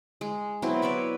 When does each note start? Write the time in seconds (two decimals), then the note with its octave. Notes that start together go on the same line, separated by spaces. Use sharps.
0.21 G#3
0.62 F#3 B3 C4 E4
0.82 B4 C#5 D5 E5